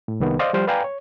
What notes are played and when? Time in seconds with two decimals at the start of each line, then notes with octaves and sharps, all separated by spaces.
0.08 A2
0.20 C2 D#3 B3
0.39 C5 D5 D#5 F5 C6
0.53 F3 G3 C5 F6
0.67 B4 D5 F5 G5 G#5 A#5
0.84 C#5